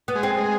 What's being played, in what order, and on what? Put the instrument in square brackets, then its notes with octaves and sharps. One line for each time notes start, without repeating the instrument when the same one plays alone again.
[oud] B3
[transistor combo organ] G#3
[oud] C4
[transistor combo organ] G#3